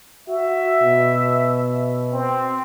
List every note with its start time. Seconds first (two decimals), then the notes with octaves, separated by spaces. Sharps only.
0.28 F#4 E5
0.82 B2
2.13 C4